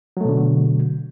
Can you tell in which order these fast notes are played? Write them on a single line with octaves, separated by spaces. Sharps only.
F#3 A3 B2 D3